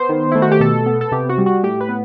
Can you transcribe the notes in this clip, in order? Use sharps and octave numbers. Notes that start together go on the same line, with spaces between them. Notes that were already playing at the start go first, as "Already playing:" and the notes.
Already playing: B3 C5
D#3
A3 E4
F#4
G4
B2 A4
B3
A4
C3 G4
F#4
G3
F#4
A2 G4
B4
B3